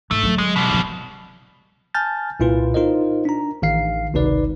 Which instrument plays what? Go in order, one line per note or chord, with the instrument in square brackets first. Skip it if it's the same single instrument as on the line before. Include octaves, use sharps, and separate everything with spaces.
[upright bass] G#2 [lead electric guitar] A3
[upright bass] D3 F#3
[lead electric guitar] G#3
B2 G3
[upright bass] C#3 F3
[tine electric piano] G#5 A5 F6 G6 A6
C2 A#2 E4 F4 B4
D#4 F4 A#4 C5 D#5
D4 A#5
A1 D#3 F5 C7
G#1 C#2 C3 D#4 B4 D5